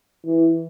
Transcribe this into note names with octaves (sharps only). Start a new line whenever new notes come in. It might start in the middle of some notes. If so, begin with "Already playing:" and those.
E3